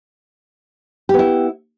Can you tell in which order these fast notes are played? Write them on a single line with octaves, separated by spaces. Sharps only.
G4 B3 E4